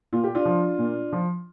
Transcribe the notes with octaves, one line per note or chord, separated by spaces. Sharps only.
A#2 F4
G4
D4 F4
F3
A#2
F3